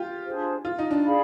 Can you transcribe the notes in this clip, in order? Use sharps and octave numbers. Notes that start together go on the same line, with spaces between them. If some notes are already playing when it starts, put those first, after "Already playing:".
Already playing: F4 G4
D4 F4 G#4 C5
F4
D#4
D4
G#4 D5 F5 B5